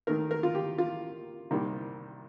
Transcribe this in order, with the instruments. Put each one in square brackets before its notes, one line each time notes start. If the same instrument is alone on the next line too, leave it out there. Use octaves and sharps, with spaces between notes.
[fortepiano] D#2 D#3 A3 A#4
A#4
F4
G4
F4
C2 C3 D#3 G3 A#3